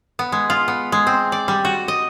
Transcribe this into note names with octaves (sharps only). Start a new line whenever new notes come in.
B3
G#3
F4
B3
G#3
C4
D5
G3
F#4
D#5